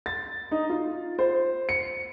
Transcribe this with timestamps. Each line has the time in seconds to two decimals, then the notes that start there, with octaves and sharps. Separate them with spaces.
0.06 A6
0.51 D#4
0.70 F4
1.19 C5
1.69 C#7